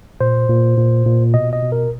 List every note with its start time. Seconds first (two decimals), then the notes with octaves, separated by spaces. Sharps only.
0.21 A#2 C5
0.49 A#2
0.78 A#2
1.06 A#2
1.34 B2 D#5
1.53 D#5
1.62 B2
1.72 A#4